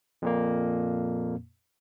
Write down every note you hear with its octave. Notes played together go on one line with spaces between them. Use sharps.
F2 A#2 A#3